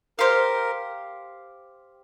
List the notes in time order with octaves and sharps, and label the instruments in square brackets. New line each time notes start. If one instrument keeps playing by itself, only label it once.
[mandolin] G4 C5 F5 [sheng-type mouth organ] A#4